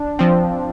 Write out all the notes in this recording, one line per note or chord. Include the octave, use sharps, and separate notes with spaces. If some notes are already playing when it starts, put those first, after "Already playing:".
Already playing: D4
F3 C4